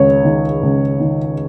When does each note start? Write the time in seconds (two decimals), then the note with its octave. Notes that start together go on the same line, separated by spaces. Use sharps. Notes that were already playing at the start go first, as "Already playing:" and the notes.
Already playing: C#2 D#3 C#5
0.25 D#3
0.63 C#2
1.00 D#3